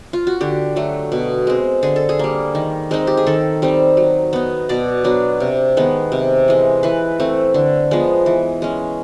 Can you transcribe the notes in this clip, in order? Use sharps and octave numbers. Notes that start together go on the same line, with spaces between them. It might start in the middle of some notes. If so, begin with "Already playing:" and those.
F4
F#4
D3 G4
F#3 A3
B2
G#3 C4
D3 G#4
A4
G#4
G3 A#3
D#3
G#3 C4 D#4
G4
G#4
D#3 A4
G3 C4 D#4
F#3
B3 D#4
B2 D5
F#3 B3 D4
C3
D#3 G#3 B3
C3
E3 G#3
E3 B4
A3 C4
D3
F3 G#3 B3
E3
G#3 C#4